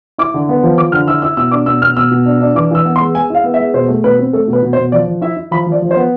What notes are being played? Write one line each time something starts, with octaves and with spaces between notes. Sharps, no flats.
E4 D6
D3
B3
F3
F3 D6
D3 F6
E4 E6
E4 E6
B2 E6
D4 D6
B2 E6
B2 F6
B2 E6
B2
D4
D4
E3 D6
E3 E6
B3
C6
G#3
G#3 G#5
E4 F5
B3
E5
G#3
B2 C5
A3
B2 B4
C4
A3 A4
B2
B4
B2
C5
B2
F3 D5
F3
E4 E5
E4
F3 B5
F3
D5
F3
C5
B3